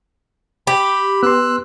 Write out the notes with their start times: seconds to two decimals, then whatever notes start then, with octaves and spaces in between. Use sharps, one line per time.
0.67 G4 B5
1.23 B3 C6 E6 F#6